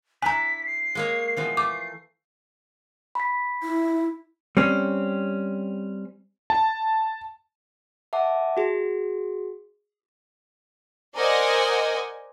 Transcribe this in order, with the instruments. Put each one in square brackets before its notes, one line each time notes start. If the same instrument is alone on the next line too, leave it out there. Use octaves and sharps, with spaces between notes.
[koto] D4 E4 [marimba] G#5 A#5 [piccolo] B6
[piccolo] C7
[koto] G#3 A#3 C#5
[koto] B2 E3 F3 [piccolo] C7
[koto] A3 [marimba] D6
[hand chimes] B5 B6
[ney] E4
[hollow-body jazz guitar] G3 C4 C#4
[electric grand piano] A5
[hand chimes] E5 F#5 A5 D6
F#4 G#4
[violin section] A#4 C5 D5 D#5 F#5 G#5